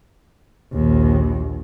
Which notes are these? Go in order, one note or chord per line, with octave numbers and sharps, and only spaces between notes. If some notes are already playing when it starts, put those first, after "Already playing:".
A#1 D#2